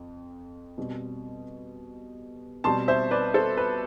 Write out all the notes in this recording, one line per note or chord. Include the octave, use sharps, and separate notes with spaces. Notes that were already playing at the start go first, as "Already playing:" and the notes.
Already playing: F2
B2 G3 C4
B2 G3 C4 A5 C6
C5 E5
B4 D5
A4 C5
B4